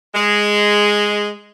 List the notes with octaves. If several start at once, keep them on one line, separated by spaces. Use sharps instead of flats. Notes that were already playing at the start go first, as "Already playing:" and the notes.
G#3